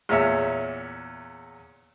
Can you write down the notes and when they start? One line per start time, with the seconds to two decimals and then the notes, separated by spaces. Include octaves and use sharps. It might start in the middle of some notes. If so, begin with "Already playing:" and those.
0.09 E2 A#2 C#5 E5